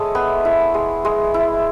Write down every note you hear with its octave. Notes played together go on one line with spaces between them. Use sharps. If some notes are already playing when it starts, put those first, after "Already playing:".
Already playing: G#3 A3 E4 C#5 D#5 A5
B3
E4
G#3
G#3
E4